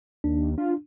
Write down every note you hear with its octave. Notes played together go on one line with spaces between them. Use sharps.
D#2 D4
D4 F4